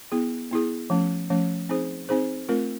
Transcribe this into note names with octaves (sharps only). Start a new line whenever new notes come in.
B3 E4 G#4
B3 E4 G#4
F3 A3 C#4
F3 A3 C#4
C4 D#4 G#4 C5
C4 D#4 G#4 C5
A3 C4 F4 A#4